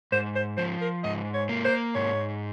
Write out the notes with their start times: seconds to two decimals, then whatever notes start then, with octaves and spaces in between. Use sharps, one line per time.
0.12 G#2 C5
0.35 C5
0.58 F3 C5
0.81 A#4
1.04 G#2 D#5
1.34 C#5
1.49 A#3
1.65 C5
1.95 G#2 C#5